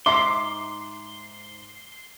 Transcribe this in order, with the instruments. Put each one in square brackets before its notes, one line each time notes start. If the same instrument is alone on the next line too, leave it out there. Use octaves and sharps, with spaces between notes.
[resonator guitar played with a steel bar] G#2 E5 A#5 [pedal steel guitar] C6 [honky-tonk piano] D6 C7